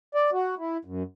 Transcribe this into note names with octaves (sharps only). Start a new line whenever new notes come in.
D5
F#4
E4
F#2